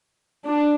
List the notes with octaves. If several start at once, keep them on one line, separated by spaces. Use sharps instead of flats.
D4